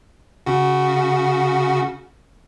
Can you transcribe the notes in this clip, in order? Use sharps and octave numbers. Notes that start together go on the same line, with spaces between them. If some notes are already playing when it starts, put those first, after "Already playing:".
C#3 F#4